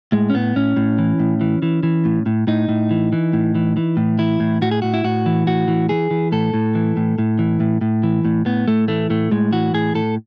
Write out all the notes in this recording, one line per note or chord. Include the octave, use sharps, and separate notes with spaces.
A2 G#3
C#4
A2 B3
A2 C#4
A2
E3
A2
E3
E3
E3
A2
A2
A2 D#4
A2
E3
E3
A2
E3
E3
A2
E3 E4
A2
A2 F#4
G#4
A2 F#4
E4
A2 F#4
E3
A2 F#4
E3
E3 G#4
E3
A2 A4
A2
E3
A2
A2
E3
A2
A2
E3
A2
A2 B3
A2 A3
E3 A3
A2 A3
A2 G#3
E3 F#4
A2 G#4
A2 A4